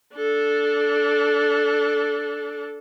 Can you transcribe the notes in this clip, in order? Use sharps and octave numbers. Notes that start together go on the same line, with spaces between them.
D4 A4